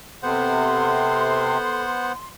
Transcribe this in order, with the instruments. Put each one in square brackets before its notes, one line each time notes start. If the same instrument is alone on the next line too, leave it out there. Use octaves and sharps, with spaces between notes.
[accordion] C3 [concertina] B3 C5 F#5 [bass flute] A4 [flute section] C6